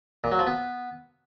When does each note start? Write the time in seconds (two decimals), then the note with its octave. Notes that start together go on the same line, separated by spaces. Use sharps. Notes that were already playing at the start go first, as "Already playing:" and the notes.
0.24 A#2
0.32 F#3
0.39 F3
0.47 B3